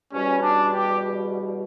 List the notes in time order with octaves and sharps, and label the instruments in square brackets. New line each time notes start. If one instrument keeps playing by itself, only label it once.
[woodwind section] E2 B2 G3 [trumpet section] C#4
[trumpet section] D4
G4